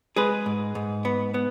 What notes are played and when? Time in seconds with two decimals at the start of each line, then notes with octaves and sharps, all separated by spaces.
0.16 G#3 G#4 B4
0.46 G#2
0.75 G#2
1.05 B3
1.34 B3